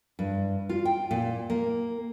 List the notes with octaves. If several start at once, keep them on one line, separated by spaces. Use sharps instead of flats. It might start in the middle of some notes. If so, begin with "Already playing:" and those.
G2
F4
G5
A#2
A#3